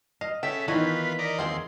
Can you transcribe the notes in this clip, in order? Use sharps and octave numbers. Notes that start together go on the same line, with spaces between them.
D#5 F5
C#3 A4 E5 G5 B6
D#3 E3 B3 E4 F4 C#5 D#5
D#4 A#4 D5
D#2 F3 C4 G#4 C6